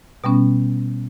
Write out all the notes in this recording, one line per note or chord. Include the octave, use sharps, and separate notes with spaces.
B2 G3 B3 C#4